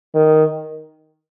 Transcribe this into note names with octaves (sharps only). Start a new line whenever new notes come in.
D#3